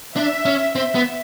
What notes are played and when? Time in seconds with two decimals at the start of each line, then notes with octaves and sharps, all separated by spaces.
0.16 D4 E5
0.45 C#4
0.75 C4 E5
0.95 B3